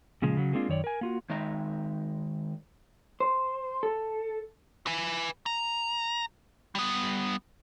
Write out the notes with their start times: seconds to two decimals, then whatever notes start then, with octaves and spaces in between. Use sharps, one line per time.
0.22 A#2 C#3 F3 G#3
0.37 C#3 F#3
0.53 G#3 A#3 C4 D4 E4 F4
0.69 F#2 D#3 C#5 D5
0.84 A#4 G#5
1.01 A#3 F4 F#4
1.29 D#3 G#3 D#4 D#5 E5 A#5
3.20 C5
3.83 A4
4.87 B4 G#5
5.46 A#5
6.75 G3 B3